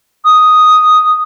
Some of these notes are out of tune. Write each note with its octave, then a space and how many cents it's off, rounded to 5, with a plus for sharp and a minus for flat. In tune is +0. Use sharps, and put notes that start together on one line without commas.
D#6 +0